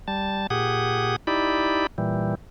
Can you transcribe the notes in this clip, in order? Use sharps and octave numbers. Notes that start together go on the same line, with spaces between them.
G3 A5
A#2 G4 G#4 F#5 D#6
D#4 E4 G4 D5 B5
A#2 E3 G3